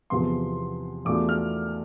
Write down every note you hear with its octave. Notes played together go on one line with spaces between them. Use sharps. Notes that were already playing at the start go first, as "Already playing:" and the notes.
E2 C3 F3 B3 C6
E2 B2 A3 D4 F4 D6
F6